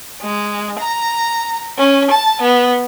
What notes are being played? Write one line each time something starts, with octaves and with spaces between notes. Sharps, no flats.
G#3
A#5
C#4
A5
B3